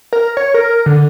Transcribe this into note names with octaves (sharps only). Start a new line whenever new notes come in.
A#4
C#5
A#4
D3